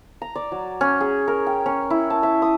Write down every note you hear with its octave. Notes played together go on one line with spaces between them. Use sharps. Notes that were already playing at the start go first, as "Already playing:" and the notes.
A#5
D5
F#3
C#4
G#4
A#4
G5
C#4
E4
A5
E5
D#6